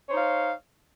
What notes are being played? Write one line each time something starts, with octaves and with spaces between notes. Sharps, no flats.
D#4 C5 C#5 F5